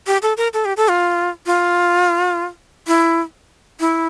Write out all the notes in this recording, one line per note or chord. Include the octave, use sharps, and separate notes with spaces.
G4
A4
A#4
A4
G4
A4
F4
F4
E4
E4